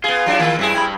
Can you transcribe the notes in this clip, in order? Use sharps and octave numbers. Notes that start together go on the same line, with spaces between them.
B3 F4 G#4
F#3 D4 E4
D#3 A#3
G2 C4 E4 G#4
G2 B5